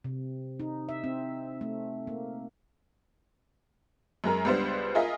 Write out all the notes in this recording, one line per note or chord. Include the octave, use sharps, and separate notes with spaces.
C3
D#4
E5
C4
A3
A#3
F#2 G#3 A#4 A#5
C#2 G3 B3 D4 C5
F4 G#4 A#4 D#5 E5